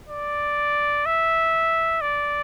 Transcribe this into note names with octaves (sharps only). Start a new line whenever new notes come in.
D5
E5
D5